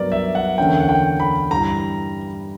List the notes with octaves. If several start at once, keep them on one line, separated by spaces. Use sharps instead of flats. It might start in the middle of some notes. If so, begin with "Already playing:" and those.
Already playing: G2 F#3 B3 A#4 D5
E5
F#5
E2 D3 A#3 C#4 G5
F#5
G5
B5
G2 E3 G3 A#5